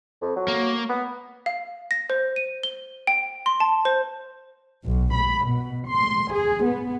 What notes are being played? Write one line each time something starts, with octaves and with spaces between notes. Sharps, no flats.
F2
F#3
A#3
B3
F5
A#6
C5
D#7
G7
G5
C6
A5
C5
B1
B5
B2
C6
G#4
B3